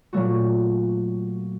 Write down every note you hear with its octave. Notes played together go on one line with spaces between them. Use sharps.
A#2 F#3 A3 F#4